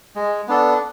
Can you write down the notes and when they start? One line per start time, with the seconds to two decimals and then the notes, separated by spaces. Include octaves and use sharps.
0.15 G#3
0.48 B3 D4 A4